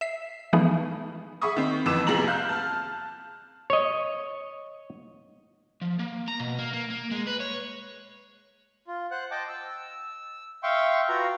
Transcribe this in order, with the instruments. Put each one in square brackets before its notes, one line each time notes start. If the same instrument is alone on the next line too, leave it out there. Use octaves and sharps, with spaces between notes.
[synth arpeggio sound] E5 B6 C7
E3 F3 G#3 A3 B3 D#4
[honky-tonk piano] G#4 E5 B5 C#6 D#6
D#3 C4
F2 E3 D6 E6 E7
A1 C3 F3 G#4 A#5 F#7
F5 F#6 G6
A5 F6
[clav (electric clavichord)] C#5 D#5
[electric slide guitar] F3
A#3
A#5
B2
A#3
A#3
A#3
G#3
B4
C#5
[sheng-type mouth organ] F4
C5 F#5 F#6
D#5 G5 A5 D6
E6
E5 F5 G5 C6 C#6
F4 F#4 B4 A#5